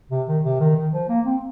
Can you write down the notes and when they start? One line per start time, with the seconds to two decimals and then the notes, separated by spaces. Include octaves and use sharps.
0.11 C3
0.28 D#3
0.44 C3
0.60 D#3
0.76 D#3
0.93 F3
1.09 A#3
1.26 C4